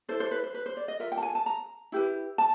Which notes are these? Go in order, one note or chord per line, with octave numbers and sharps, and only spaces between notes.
E4 A4 C5
C5
B4
C5
B4
C5
D5
D#5
F4 A#4 E5
G5
A5
G#5
A5
A#5
E4 G4 B4
A5